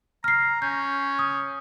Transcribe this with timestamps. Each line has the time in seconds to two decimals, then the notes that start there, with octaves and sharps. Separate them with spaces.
0.24 A#5 F6 C7
0.62 C#4 G6
1.19 D#6